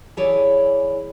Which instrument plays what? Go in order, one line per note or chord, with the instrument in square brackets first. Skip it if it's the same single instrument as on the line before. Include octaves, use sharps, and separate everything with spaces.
[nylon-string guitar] E3 E4 G#4 C#5 D5